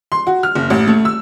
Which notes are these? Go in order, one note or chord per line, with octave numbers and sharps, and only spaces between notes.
C6
F#4
F6
F#1
A1
A3
E6